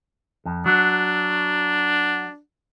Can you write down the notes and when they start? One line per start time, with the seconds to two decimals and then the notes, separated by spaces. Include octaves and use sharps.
0.45 F2
0.66 F#3 D4